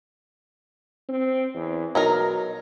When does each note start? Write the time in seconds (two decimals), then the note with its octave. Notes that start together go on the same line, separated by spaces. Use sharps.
1.09 C4
1.54 E2
1.95 B2 F#3 D#4 A#4